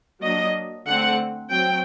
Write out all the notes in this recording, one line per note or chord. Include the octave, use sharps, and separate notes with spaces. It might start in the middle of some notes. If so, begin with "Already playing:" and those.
F#3 A#3 D4 D#5
D3 A3 C4 F#5
F#3 C4 G5